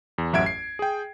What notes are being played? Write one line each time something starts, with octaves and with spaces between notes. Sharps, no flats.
E2
A1 F#2 E5 F#5 G#6 D7
C7
G#4 G5